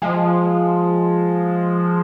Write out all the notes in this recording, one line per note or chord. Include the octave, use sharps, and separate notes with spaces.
F3 G#3